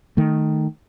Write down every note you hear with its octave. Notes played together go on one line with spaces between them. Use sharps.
D#3 A3